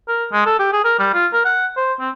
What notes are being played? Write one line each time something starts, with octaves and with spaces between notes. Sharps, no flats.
A#4
G#3
A4
G4
G#4
A#4
G3
F4
A#4
F#5
C5
C4